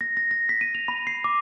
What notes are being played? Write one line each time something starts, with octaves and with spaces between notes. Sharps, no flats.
A#6
A#6
A#6
B6
D#7
F7
B5
C7
D6